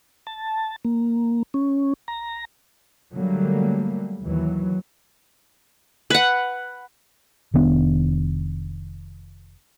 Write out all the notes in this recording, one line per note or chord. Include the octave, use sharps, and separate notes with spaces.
A5
A#3
C#4
A#5
D3 F#3 G3 A3 A#3
D#2 E3 F#3
B4 F#5
F1 D#3 B3 D4